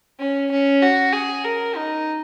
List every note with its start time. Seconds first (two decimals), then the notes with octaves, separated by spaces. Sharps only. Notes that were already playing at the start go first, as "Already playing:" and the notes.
0.19 C#4
0.51 C#4
0.82 F#4
1.13 G#4
1.44 A#4
1.76 D#4